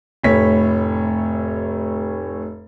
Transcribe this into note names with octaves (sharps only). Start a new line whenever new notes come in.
F1 A2 C#5 B6